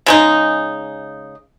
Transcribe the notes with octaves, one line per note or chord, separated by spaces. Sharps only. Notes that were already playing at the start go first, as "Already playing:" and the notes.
C#3 G#3 D#4